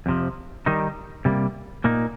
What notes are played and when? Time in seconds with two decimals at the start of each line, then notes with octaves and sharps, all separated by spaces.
0.06 F2 C3 F3
0.66 D#3 G3 D#4
1.25 C3 G3 A#3
1.84 A#2 A#3 D#4